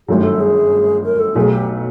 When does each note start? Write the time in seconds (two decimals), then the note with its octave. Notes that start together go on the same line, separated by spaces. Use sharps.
0.08 G1 F#2 D#3 F#3 A3 G4
0.24 A4
0.40 G#4
1.04 A#4
1.19 A4
1.35 B1 B2 F#3 A3 G#4
1.52 G4